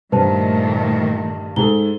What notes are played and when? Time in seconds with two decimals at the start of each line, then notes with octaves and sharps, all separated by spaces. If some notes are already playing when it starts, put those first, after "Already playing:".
0.12 G2 A#2 D#3 A3 B4 C5 A5
1.56 G#2 G#4 A4 G7